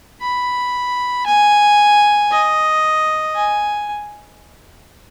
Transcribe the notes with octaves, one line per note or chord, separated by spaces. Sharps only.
B5
G#5
D#5
G#5